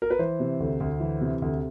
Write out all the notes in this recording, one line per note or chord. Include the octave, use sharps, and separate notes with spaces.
A#4
B4
E3 C5
C3
D2
D2
E3
C3
D2